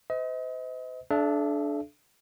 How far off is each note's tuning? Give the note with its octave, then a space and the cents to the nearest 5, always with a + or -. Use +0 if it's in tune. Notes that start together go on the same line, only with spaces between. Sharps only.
C5 -40 D#5 +35
D4 +0 A4 -40 E5 +35